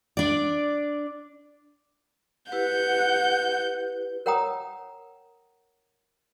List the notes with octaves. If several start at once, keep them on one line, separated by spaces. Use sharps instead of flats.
D4 D5
E4 G4 B4 F#5 G6
A#4 C#5 F#5 G5 A#5 D#6